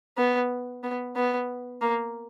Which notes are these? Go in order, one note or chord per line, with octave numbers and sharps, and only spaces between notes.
B3
B3
B3
A#3